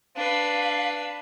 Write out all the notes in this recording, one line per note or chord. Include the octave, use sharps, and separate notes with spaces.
D4 B4 F5